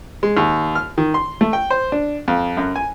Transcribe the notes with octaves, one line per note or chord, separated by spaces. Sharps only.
G#3
D#2
F6
D#3
C6
A3
G5
C5
D4
F2
F#2
G#5